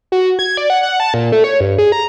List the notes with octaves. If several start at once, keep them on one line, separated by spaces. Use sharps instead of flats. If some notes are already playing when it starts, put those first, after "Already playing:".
F#4
G#6
D5
F#5
F#5
A5
A#2
A3
C#5
G2
G#4
A#5